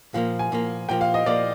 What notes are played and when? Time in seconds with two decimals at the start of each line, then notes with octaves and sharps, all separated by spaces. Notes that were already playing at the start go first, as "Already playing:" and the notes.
0.14 A#2 F3 A#3 F5
0.39 G#5
0.52 A#2 F3 A#3
0.89 A#2 F3 A#3 G5
1.01 F5
1.14 D#5
1.26 A#2 F3 A#3 D5